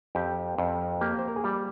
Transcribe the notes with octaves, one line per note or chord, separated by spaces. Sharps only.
F2 G4
F2
A#3 G4
C5
A#4
G#4
G3 G4